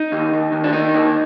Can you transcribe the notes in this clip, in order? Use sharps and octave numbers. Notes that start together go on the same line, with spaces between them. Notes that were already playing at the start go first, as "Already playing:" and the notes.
Already playing: D#4
D#2
D#2
D#2
D4
D#3 D#4
D#2